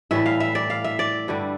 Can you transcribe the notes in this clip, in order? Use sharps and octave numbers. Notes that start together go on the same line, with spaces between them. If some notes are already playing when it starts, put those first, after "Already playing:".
A2 E3 G3 E5
F5
E5
D5
F5
E5
D5
G2 D3 G3